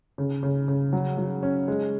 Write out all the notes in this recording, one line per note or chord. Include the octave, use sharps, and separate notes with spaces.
C#3
C#3
C#3
F#3
F#3
C#4
G#3